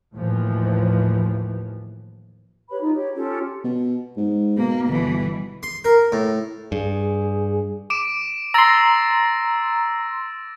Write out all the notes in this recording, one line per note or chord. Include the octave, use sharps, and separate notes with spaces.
D#2 A2 E3 F3
G4 B4 C#5 B5
D#4 F4
G4 C#5
C#4 F4 G4 A4
B2
G#2
B2 A#3
G1 B2 E3
C6
A#4
A2
G2 G#4
D6 D7 E7
A#5 C6 E6 A6 A#6